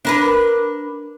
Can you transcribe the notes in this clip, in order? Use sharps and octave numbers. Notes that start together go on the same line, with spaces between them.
D4 A#4 B4